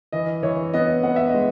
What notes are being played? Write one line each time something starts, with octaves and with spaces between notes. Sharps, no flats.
E3 D#5
E3 C#5
B3 D#5
B3 F#5
E5
D#5
G#3